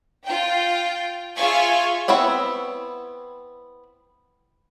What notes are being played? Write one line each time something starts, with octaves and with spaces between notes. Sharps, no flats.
F4 G5
F4 G#4 E5 F5 G#5 C#6
B3 C4 E4 C#5 F#5